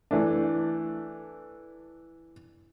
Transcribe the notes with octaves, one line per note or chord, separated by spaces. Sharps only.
E3 A3 D4